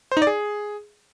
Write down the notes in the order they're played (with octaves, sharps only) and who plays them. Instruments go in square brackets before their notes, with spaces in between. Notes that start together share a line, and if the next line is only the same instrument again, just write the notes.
[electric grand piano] C5
D#4
D5
G#4